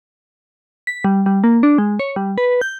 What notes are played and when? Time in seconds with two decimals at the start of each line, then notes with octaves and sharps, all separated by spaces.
0.87 B6
1.05 G3
1.26 G3
1.44 A#3
1.63 D4
1.78 G#3
1.99 C#5
2.16 G3
2.38 B4
2.61 G6